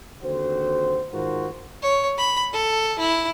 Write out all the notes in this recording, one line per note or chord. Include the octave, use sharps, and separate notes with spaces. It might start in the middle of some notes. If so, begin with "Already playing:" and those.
D#2 D3 C4 F#4 C5
G#2 D#3 F4 F#4 A#4 C5
C#5
B5
A4
E4